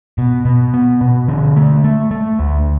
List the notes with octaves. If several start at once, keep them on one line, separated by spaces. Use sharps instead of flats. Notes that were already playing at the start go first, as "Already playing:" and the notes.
B2
B2
B3
B2
D3
A3
A3
A3
D2